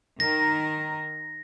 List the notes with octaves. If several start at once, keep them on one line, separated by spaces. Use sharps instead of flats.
D#3 A#4 A#6